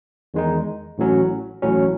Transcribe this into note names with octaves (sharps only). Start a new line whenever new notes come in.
E2 D#3 G#3 D#4
A1 A2 F#3 C#4
A1 A2 F#3 C#4